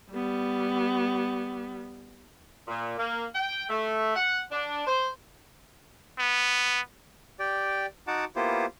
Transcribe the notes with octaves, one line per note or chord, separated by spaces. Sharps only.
G3 B3
A#2
A#3
G5
A3
F#5
D4
C5
B3
G4 D5 G5
D#4 F#4 F#5 A5 D6
A#3 B3 E4 F4 G4 C5